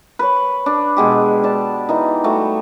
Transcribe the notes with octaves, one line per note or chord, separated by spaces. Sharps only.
B4 C#5
D4
B2 G#3 G4
D5 A5
E3 D#4
G3 A3 F#4